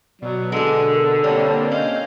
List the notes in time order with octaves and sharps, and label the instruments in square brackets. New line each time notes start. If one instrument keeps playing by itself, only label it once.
[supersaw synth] B2 [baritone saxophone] F#3 [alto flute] D5
[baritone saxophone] D3 [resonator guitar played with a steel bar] G#3 G#4 [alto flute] D4
[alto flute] A#4
[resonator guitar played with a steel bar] G3 [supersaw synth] A#3 C4 D4 [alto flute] C#5
[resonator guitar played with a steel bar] C#4 [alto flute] D#5 [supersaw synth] F5 G6